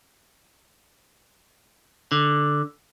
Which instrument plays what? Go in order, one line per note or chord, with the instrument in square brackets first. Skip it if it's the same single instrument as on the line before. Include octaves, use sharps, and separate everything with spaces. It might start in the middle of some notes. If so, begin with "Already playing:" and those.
[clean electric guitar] D3